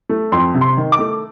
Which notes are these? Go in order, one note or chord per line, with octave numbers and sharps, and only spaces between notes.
A3
F2 C6
C3
C6
D#3
D6
A3